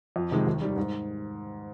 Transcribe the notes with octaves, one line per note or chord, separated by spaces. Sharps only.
F2
C3 D#3 G#3
D#2
D#3 G3
G#2